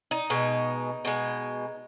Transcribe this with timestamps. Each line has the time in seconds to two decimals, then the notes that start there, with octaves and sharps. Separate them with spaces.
0.11 D#4
0.30 B2 G#3
1.05 B2 G#3